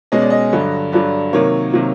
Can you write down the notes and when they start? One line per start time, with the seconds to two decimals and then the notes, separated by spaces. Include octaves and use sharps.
0.12 B2 G#3 C#4 D#5
0.21 D5
0.30 D#5
0.53 G2 D3 F#3
0.92 G2 D3 F#3 D5
1.33 C3 D#3 F#3 A#3 C#5
1.73 C3 D#3 F#3 A#3